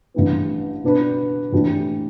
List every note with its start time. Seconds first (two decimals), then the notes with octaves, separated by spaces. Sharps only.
0.14 A1 G2 E3 B3
0.84 B2 B3 D4 B4
1.52 A2 E3 A3 D4 G4